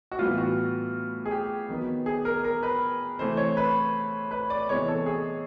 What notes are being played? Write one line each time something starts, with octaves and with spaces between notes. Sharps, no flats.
F#4
A2 E3 G3 B3 F4
F#4
G#4
G4
D#3 F#3 B3
G#4
A#4
A#4
B4
C3 E3 A3 C5
C#5
B4
B4
D5
C3 E3 G#3 B3 C#5
A4
G#4